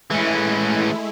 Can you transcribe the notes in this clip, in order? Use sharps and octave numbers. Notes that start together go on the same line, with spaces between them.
E3 G#3 A3 C#4 E4